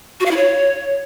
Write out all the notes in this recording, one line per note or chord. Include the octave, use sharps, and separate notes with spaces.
F#4
F5
E4
C#5